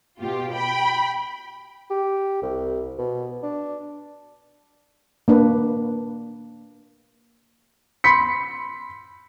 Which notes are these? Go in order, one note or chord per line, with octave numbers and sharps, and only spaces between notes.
B2 F4 G4
G5 B5
G4
C2
B2
D4
A#3 D4 B4
B5 C6 B6 C#7